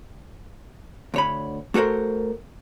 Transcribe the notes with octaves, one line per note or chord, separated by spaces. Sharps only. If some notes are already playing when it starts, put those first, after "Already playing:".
D2 C#5 B5
A3 F#4 A4 A#4 C5